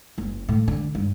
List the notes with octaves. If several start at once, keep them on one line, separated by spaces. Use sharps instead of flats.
F#1
A2
D3
G2